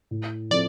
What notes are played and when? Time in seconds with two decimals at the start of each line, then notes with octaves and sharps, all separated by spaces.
0.11 A2
0.51 F3 C4 E4 A4 D5